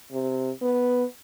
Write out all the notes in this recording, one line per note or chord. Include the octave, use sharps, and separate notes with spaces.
C3
B3